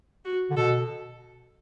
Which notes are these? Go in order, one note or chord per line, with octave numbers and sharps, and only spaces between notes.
F#4
D3
B2 A4